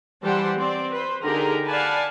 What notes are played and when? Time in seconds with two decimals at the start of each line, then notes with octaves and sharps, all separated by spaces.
0.24 E3 G3 G4 C5 F#5 A5
0.58 C4 D5
0.92 B4 C5
1.23 D3 D#4 G4 G#4 A#4 A#5
1.67 D5 F5 F#5 G#5 A5 B5